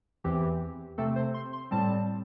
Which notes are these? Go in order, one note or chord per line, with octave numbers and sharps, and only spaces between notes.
E2 E3 C4 G4
C3 A3 C4 A4
C5
C6
C6
A2 G3 C4 A5